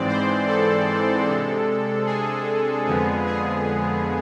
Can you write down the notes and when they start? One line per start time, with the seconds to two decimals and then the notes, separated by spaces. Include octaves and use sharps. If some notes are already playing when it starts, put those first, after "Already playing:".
Already playing: G#2 E3 G#3 C4 D5
0.08 C5
0.47 A4
1.28 C3 G#3 D4
2.07 G#4
2.87 F2 D3 F3 G#3 B3
3.27 G#4